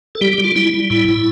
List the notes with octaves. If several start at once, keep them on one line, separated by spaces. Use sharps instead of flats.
A4
G3 G4
G4
G3
F4
G3 E4
G3
A2 E4
A2